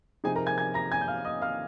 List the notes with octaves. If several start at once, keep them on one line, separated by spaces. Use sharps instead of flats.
C3 F3 C4 D#4 G#4 G#5
A#4 A#5
G#5 G#6
G#5 G#6
A#5 A#6
G#5 G#6
G6
F5 F6
D#5 D#6
F5 F6